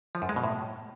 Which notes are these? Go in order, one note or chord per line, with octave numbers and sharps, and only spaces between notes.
F3
F#2
G#3
B2
A2